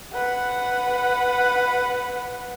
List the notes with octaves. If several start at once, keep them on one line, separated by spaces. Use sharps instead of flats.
B4 F#5